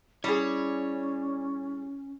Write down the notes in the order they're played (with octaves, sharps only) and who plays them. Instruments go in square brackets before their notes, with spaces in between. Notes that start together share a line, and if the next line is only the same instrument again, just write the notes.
[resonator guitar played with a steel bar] G3 G#4 [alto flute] C#4 [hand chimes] E4 [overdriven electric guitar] C#5